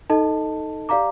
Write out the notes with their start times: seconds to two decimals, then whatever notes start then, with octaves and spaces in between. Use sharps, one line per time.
0.10 D#4 A4 D#5 A5
0.89 G4 D5 F5 A#5 D6